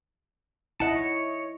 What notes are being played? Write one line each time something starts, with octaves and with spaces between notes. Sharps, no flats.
E4 D#5 F#5 A5
C#5